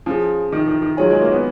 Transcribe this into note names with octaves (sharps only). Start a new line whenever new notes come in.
F3 C#4 F4 G#4
D#3
D#3
D#3
F#3 F4 G#4 C#5 G#5
G#3
A#3
B3